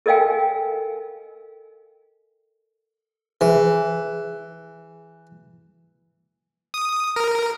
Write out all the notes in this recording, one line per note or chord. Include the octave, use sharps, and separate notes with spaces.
A4 A#4 D#5 F5 G5 G#5
E3 G#4
D#6
A#4